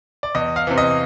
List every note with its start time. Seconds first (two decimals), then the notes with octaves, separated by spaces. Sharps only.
0.23 D5
0.35 E2 D#5
0.56 F5
0.67 C3 E3
0.78 D#5